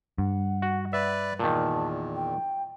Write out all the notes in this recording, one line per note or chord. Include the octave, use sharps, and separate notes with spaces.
G2 F#5
F#4
B4 D5 E5
E2 A#2 D#3 A5
G5